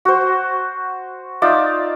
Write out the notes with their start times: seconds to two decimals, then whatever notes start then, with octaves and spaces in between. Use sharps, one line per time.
0.05 F#4 C5
1.42 D#4 F4 D5 E5